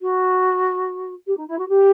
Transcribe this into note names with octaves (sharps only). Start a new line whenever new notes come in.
F#4
G4
D#4
E4
F#4
G4